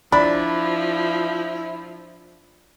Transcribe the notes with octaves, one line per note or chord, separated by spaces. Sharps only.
F3 D4 E4 B5